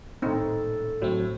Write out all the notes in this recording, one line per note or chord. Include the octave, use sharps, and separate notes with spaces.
D#1 A2 C4 D#4 A4
A2 F#3 A3 C4